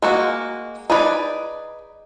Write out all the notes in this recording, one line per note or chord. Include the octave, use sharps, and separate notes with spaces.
G#3 A#3 F#4
D#4 G#4 B4 D5 B5